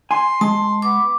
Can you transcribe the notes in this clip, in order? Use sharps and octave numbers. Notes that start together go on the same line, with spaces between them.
G#5 C6
G#3 A5 C6
B3 D6